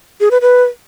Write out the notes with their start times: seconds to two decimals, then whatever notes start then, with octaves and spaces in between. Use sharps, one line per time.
0.20 G#4
0.31 B4
0.41 B4